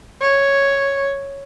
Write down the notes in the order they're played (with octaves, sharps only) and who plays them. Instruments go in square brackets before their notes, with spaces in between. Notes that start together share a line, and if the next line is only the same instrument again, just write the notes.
[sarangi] C#5